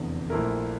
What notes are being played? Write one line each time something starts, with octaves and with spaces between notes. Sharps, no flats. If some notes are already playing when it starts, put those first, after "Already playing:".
Already playing: F1 E2 D3
A#1 A#2 A3 E4 A#4